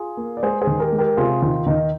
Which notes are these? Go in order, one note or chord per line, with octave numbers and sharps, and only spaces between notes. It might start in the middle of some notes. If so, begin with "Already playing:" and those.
Already playing: F4 G#4
A#3
D5
G#3 G#4 C5
G#4 C5
D#3
G4 A#4
G#3
G4 A#4
C3 F4 G#4
D#3 F4
D#3 D#4